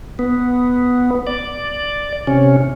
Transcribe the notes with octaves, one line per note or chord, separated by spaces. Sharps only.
B3
D5
C3 C#4